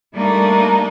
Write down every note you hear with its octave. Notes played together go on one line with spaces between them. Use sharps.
G3 A3 A#3 D4 D#4 A#4